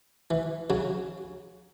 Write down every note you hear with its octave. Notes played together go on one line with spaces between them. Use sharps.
E3
C#3 F#3